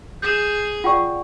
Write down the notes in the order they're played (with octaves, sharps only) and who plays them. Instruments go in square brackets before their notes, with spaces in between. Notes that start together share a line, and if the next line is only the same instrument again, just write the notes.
[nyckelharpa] G#4 [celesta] G6 E7
[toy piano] F4 G5 C#6 [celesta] D5 F#5